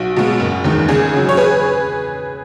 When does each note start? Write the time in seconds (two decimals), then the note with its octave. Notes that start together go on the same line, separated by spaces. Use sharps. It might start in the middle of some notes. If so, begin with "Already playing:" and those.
Already playing: B1 F#4
0.16 B2 G#3
0.40 F#1
0.64 E2 D#3 G#3
0.89 C#2 G#4
1.13 C#3 F#3
1.29 C#5
1.37 G#4 B4